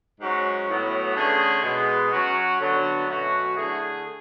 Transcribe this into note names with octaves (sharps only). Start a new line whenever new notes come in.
G#2 F#3 C#4 F#4
A2 F#3 B3
D3 A3 C#4 G#4
B2 G#3 B3
F#3 C#4 F#4
D3 F#3 B3
B2 F#3 A3 C#4 F#4
D3 A3 E4 G#4